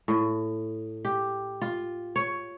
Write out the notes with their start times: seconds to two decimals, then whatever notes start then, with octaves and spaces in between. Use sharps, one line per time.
0.08 A2
1.05 G4
1.62 F4
2.16 C#5